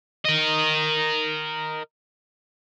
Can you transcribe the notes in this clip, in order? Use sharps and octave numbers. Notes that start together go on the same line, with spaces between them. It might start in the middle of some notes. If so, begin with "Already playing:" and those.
A#4 D#5